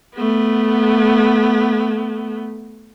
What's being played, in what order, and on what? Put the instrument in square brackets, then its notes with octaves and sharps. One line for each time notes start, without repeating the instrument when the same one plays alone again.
[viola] A3 B3